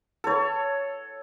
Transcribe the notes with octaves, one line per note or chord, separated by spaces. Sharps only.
A4 C#5